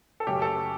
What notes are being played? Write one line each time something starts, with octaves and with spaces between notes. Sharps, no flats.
A4
F#1 F#2 F#3 A3 G4
A4